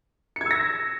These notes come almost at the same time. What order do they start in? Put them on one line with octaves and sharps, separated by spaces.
C#7 G#6 E6 A#6